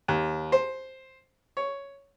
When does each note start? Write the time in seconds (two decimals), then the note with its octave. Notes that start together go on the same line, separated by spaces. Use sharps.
0.08 D#2
0.52 C5
1.57 C#5